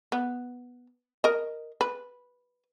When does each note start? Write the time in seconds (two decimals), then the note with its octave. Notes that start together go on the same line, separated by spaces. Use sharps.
0.12 B3
1.24 A#4 D#5
1.81 B4